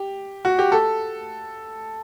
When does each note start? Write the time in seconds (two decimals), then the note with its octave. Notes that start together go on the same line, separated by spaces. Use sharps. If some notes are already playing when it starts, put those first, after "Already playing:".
Already playing: G4
0.45 F#4
0.59 G4
0.72 A4